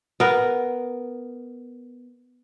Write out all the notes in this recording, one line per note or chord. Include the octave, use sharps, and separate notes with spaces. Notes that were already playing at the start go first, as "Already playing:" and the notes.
B3 A#4